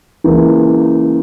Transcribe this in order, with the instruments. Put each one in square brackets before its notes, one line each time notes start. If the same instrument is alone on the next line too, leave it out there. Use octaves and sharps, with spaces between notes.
[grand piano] C#2 C#3 E3 A#3